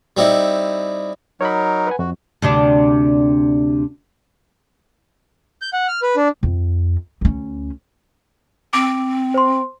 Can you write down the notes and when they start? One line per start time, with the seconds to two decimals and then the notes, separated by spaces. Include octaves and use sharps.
0.17 G3 C4 D#4 E4
1.41 F#3 D#4 A#4 C#5 B5
1.87 B4 F#5 G#5
1.99 F2 F#4
2.42 D2 C3 D4
5.62 G6
5.73 F#5
5.88 F6
6.02 B4
6.17 D4
6.43 F2
7.21 D2 C#4
8.73 C4 D6 D7
9.34 C5 C6